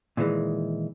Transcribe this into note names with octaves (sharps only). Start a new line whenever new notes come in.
A#2 D#3 E3 G#3